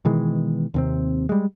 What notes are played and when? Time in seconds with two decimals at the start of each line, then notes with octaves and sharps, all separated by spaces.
0.05 B2 D#3 E3 G#3
0.74 D#2 C3 C4
1.29 G3 G#3